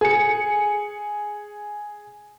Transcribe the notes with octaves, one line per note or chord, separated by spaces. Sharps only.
G#4 C#7